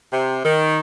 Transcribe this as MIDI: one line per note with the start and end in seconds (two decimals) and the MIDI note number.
0.12 0.38 48
0.44 0.80 51